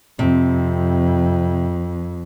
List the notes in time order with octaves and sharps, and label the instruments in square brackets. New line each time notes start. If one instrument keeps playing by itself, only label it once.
[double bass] F2 [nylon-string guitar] C3